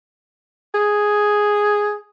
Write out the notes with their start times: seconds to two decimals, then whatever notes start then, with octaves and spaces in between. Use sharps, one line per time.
0.75 G#4